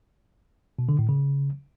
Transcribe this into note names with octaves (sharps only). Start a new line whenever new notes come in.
B2
D3
A2
C#3